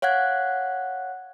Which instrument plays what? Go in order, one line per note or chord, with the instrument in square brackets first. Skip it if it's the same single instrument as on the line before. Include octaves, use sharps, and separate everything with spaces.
[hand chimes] C#5 F5 F#5 F#6 G#6